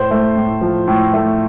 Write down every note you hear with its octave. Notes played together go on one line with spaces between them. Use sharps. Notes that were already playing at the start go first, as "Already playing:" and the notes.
Already playing: A2 C5
A3
A2
F3
A2
A3